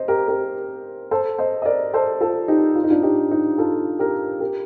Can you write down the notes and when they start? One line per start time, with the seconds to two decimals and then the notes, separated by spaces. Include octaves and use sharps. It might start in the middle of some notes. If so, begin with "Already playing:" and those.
Already playing: C5 D#5
0.08 G4 A#4
0.28 G4 A#4
1.11 A4 C5
1.38 C5 D#5
1.62 D#5
1.65 A#4 D5
1.93 A4 C5
2.20 F4 A4
2.48 D#4 G4
2.75 F4
2.84 D#4
2.90 D4 F4
3.03 D#4 G4
3.31 D#4 G4
3.58 F4 A4
3.99 G4 A#4
4.40 G4 A#4